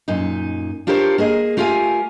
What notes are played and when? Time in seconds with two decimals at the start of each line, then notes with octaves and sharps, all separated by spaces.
0.08 F#2 A#2 D#4
0.87 D4 F4 G4 A#4 C5 C#5
1.18 A#3 G#4 D#5
1.57 A3 F4 G4 A#4 F5 G#5